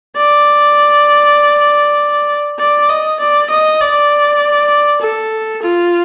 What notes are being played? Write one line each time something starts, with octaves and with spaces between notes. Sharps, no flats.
D5
D5
D#5
D5
D#5
D5
A4
F4